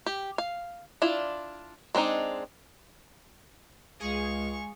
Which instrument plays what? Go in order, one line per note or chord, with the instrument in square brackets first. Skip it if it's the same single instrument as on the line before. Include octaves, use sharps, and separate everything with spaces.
[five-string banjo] G4
F5
D4 E4 F4 D5
G#3 C4 D4 D#4
[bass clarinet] C#2 [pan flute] G#3 [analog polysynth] G#4 [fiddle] F5 C#6